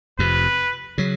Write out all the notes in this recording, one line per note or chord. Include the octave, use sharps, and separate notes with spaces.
F1 F2 C3 B4
C#3 F#3